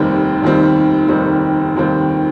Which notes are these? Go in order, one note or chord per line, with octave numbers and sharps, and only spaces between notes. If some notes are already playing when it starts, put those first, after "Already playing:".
Already playing: F1 D#2 D#3 G3 C4
F1 D#2 D#3 G3 C4
F1 D#2 D#3 G3 C4
F1 D#2 D#3 G3 C4